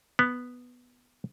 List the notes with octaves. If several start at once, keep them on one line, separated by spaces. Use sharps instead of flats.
B3